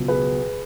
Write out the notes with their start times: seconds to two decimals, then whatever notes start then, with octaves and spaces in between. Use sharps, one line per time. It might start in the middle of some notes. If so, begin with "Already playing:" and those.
Already playing: C#2 B2 F#3
0.08 G#4 B4